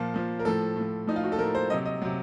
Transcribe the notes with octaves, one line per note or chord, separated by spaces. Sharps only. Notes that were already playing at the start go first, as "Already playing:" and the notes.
Already playing: A#2 F3 F4
A#2 F3
A#4
A2 F3 A4
A2
F3
A2 F3 D#4
F4
F#4
A4
A2 F3 A#4
C5
C3 F#3 D#5
D#5
C3 F#3